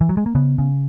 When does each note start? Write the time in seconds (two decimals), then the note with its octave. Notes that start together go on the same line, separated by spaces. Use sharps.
0.01 E3
0.09 F#3
0.17 G#3
0.26 A#3
0.35 C#3 B3
0.58 C#3